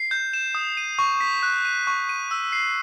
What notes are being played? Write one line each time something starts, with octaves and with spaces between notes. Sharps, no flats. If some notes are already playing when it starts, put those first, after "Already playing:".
Already playing: C7
G6
E7
D#6
D#7
C#6
B6
F#6
D#7
C#6
D#7
E6
C7